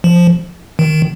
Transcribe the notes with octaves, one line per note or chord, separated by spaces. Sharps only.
F3
D#3